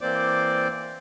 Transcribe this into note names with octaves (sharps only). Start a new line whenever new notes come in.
E3 A#3 C4 C5 D5 D6